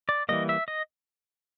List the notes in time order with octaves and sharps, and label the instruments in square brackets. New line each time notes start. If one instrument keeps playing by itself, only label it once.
[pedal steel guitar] D5
E3 G3 A#3 D#5
E5
D#5